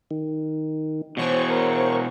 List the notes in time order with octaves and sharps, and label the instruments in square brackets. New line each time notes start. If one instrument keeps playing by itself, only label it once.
[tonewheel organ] D#3
[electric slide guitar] B2 E3 [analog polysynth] C5 C#5 C#6
[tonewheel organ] A#4